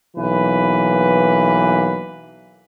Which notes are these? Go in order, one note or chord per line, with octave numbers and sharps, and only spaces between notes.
B1 E3 A#3 B4